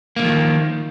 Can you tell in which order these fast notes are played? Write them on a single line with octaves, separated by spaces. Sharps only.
A#3 D3 F3 D#3